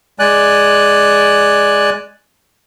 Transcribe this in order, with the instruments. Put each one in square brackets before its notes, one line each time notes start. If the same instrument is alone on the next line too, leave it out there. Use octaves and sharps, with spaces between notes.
[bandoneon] G#3 D5 G#5 F#6